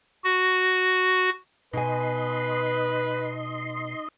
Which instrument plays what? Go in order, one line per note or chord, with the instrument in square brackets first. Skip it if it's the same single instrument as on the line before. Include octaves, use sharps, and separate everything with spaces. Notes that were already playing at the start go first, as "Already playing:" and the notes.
[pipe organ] F#4
[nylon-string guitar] B2 G#5 [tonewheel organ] D#4 D#5 C6 [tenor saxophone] B4